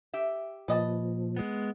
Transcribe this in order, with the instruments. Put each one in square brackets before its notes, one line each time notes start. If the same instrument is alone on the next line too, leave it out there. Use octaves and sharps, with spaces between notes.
[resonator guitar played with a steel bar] G4 E5
[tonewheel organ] A#2 F3 [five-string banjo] B4 D#5 A5
[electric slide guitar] G#3 B3